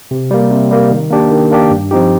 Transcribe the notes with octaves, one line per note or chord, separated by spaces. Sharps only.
C3
G3 A#3
C3
G3 A#3
D#3
A#3 D4 G4
D#3
A#3 D4 G4
G2
F3 C4 D#4 G4